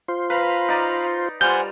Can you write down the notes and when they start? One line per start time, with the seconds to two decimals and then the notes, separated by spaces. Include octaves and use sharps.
0.08 F4 C5
0.30 B4 F5 A#5 B5
0.68 D#4 D5
1.41 G3 F4 C5 F#5 G#5 G6